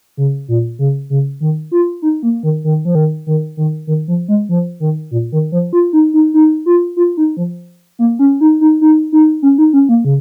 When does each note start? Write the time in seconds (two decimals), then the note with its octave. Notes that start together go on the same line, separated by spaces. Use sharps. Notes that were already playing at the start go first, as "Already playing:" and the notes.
0.17 C#3
0.48 A#2
0.79 C#3
1.10 C#3
1.40 D#3
1.72 F4
2.02 D#4
2.23 A#3
2.43 D#3
2.64 D#3
2.85 F3
2.95 D#3
3.27 D#3
3.57 D#3
3.87 D#3
4.08 F3
4.28 G#3
4.49 F3
4.80 D#3
5.11 A#2
5.32 D#3
5.52 F3
5.73 F4
5.93 D#4
6.14 D#4
6.34 D#4
6.66 F4
6.96 F4
7.17 D#4
7.37 F3
7.99 A#3
8.19 C#4
8.41 D#4
8.61 D#4
8.81 D#4
9.12 D#4
9.43 C#4
9.58 D#4
9.73 C#4
9.89 A#3
10.05 C#3